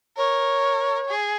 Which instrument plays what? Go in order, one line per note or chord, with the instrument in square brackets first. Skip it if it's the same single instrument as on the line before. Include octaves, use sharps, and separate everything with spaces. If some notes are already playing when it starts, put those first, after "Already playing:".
[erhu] A#4 [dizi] C#5
[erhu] G#4